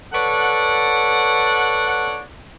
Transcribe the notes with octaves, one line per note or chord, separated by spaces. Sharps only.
A4 B4 C#5 D5 F#5